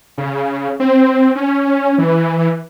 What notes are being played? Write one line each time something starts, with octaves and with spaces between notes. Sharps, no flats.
C#3
C4
C#4
E3